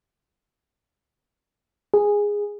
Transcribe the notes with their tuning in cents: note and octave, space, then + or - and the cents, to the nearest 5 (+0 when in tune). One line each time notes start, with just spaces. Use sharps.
G#4 -10